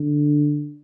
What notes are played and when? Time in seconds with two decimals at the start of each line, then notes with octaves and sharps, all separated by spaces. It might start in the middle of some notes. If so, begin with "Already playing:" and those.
Already playing: D3